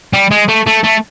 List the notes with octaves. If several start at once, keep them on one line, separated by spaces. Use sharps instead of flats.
G3
G#3
A3
A3
A3